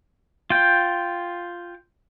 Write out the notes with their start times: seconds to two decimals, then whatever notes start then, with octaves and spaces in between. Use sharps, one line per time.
0.50 F4 G5